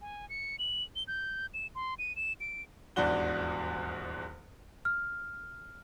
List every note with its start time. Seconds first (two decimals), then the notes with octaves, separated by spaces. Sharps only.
0.02 G#5
0.29 C#7
0.59 F#7
0.96 G7
1.08 G6
1.54 E7
1.75 C6
1.99 D#7
2.16 E7
2.40 D7
2.96 D#1 E2 G#2 D4 F#4 G7
4.85 F6